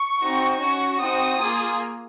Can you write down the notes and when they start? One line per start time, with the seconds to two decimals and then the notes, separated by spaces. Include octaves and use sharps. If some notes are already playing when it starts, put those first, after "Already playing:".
Already playing: C#6
0.20 C4 D#4 F#4
0.60 C#4 F#4 C#6
1.00 C4 D#4 F#4 D#6
1.40 A#3 F4 G#4